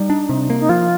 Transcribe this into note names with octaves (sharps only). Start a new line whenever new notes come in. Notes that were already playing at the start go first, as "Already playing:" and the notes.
Already playing: G3 D#4
D4
C3
A#3
D#4
F3 F4